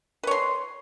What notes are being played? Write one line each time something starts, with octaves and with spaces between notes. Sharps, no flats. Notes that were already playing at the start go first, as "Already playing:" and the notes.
B4 C#5 C6